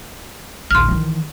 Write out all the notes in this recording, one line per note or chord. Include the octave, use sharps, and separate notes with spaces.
A#1 D#2 C6 F6
D#3 E3